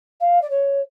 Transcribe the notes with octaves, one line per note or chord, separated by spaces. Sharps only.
F5
D5
C#5